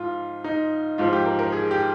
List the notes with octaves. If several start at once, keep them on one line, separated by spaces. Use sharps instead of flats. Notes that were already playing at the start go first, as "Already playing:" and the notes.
Already playing: G#2 F3 F4
D#4
G#2 F3 F4
G4
A#4
A#4
G#4
G4